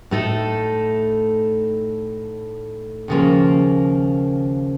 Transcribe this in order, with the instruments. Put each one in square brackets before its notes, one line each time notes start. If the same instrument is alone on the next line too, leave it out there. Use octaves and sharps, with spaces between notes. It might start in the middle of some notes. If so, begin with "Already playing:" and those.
[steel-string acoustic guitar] A2 A3 D#4 A4
D#2 C#3 F3 A#3